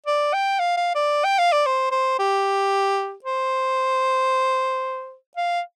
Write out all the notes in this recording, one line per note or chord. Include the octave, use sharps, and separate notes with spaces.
D5
G5
F5
F5
D5
G5
F5
D5
C5
C5
G4
C5
F5